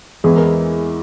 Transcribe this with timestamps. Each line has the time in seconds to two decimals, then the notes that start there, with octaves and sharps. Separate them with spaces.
0.24 E2 E3 G#3 E4 G#4
0.36 A#4